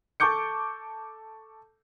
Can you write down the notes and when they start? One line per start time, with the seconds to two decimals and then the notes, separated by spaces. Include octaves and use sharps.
0.20 A4 A5 C#6 D6 G6 C#7